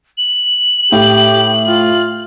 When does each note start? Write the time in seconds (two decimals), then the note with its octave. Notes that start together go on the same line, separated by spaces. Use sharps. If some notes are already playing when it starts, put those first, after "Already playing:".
0.18 F#7
0.92 A2 G4
1.66 F4